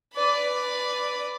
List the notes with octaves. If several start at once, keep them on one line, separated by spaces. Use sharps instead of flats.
B4 D5